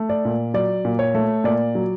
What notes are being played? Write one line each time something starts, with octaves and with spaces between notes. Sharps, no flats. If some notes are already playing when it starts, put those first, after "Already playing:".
Already playing: A3
D5
A#2
F#3 D5
A#2
C#5
A3
A#2 D5
F#3